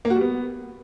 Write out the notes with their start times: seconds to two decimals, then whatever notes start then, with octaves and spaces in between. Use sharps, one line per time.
0.05 A#3
0.10 F#4
0.16 G3
0.21 B3